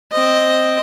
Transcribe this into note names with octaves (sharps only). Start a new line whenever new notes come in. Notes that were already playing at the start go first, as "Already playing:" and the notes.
C4 D#5